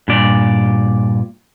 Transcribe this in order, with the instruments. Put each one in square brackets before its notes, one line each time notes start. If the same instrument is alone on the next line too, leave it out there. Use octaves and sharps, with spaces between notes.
[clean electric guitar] G2 A#2 D5